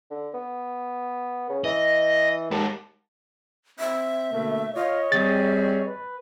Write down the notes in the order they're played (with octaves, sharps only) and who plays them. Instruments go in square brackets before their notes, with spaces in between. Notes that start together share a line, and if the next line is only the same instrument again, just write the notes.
[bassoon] D3
B3
C#3
[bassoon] E3 [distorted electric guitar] D#5
[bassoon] D#2 [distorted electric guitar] G#2 A5
[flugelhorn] C4 [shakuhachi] E5
[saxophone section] B2 D3 A#3 [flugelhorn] A3
[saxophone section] F4 [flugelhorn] C#5 [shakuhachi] D#5
[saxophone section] G3 C4 G#4 [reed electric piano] A6
[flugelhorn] B4